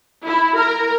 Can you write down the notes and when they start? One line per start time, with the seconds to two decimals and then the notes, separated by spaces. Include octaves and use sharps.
0.25 E4
0.55 A#4